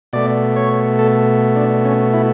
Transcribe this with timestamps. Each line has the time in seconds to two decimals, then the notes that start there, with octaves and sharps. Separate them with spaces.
0.13 B2 A3 D5
0.56 C#5
0.99 A4
1.56 D4
1.85 C#4
2.14 E4